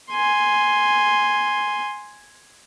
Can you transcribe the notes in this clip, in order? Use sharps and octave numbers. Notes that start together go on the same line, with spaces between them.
G#5 C6